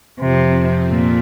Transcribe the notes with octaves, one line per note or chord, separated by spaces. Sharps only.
F2 C3 F3 C4
A#2